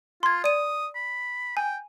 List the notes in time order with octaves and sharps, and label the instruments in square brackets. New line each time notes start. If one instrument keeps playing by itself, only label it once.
[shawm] F4 [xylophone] C6 G#6
[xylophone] D5 D#7 [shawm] D#6
[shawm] B5
[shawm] G5 [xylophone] G#5